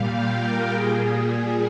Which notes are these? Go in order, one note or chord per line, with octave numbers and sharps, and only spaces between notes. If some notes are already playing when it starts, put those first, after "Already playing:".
Already playing: A#2 G3 F5
G5
A#4
A#2 G3 G#4
G#4
G#4